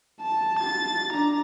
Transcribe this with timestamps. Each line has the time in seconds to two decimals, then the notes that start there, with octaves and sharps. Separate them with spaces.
0.21 A5
0.59 A6
1.12 D4 A#5